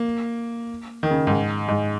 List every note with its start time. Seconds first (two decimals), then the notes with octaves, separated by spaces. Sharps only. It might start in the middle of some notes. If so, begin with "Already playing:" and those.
Already playing: A#3
1.03 D#3
1.10 C#3
1.27 G#2
1.68 G#2